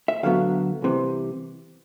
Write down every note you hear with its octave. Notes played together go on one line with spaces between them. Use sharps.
E5
D2 D3 F#3 B3 F5
C2 C3 E3